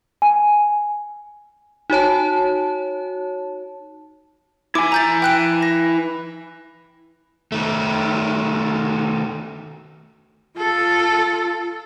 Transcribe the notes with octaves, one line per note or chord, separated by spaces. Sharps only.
G#5
D#4 F#4 C#5 A5
E4 G#5 D6
A#5 G6 A6
G5 F#6 D7
A#6
D#3 A3
F4 A4